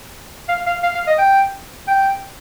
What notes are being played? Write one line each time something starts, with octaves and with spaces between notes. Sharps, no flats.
F5
F5
F5
F5
D#5
G5
G5